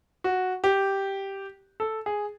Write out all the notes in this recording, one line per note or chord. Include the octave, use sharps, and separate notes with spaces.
F#4
G4
A4
G#4